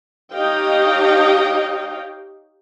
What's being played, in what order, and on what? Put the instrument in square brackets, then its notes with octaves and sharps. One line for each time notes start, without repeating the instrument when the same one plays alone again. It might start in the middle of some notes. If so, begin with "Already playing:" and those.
[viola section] D#4 G4 C#5 D#5 F5 G5